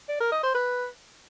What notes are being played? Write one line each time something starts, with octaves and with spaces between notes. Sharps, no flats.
D5
A#4
D#5
C5
B4